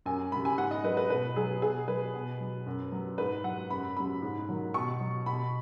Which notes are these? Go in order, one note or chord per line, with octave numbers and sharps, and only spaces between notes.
F#2 G#5
C#3 F#3 B5
G#5
G#2 F#5
D#5
F#3 B4
B4
B2 B4
F#3 G#4
B2 G#4
F#3 B4
B2
F#3
F#2
F#3
G#2 B4
F#3 F#5
F#2 B5
C#3 F#3 B5
G#2
D#3 F#3
B2 C#6
F#3
B2 B5